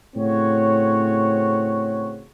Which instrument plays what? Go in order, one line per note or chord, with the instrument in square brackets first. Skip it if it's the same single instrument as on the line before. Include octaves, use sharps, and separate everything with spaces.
[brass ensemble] A2 C#3 C4 F#4 C#5